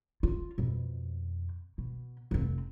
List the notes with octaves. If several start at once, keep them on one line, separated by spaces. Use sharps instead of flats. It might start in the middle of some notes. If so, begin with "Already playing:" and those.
F4
F2 B2
B2
F1 C4